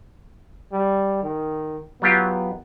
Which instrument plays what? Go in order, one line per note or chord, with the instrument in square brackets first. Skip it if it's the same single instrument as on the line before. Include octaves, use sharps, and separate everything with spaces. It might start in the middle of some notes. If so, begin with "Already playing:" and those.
[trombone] G3
D#3
[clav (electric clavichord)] F#3 F4 G4 [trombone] B3